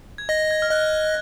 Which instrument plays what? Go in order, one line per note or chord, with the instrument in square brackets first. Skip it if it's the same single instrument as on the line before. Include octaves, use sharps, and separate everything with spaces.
[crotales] G#6
[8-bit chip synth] D#5 [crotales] A#6
[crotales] G#6
F6
[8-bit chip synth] D#5 [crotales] F#6